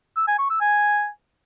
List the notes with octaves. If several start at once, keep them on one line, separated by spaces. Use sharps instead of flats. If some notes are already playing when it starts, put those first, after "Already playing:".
E6
G#5
C#6
E6
G#5